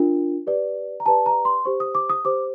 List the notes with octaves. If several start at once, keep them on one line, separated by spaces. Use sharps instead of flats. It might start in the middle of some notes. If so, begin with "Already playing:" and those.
Already playing: D4 F4 A#4
G4 B4 D5
A#5
G4 B4 D5 A5
A#5
C6
G4 C5 C#6
D#6
D6
D#6
G4 C5 D6